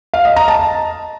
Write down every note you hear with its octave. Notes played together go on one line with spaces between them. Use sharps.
F5
D#5
A#5
A5